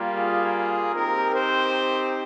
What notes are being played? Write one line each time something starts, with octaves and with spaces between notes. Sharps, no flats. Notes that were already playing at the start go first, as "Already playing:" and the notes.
Already playing: G3 A#3 F4
G#4
C4 D#4 G4 A#4
C5